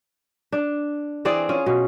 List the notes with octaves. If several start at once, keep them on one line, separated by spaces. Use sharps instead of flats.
D4
E3 C4 G#4 D5
C#4 F4
B2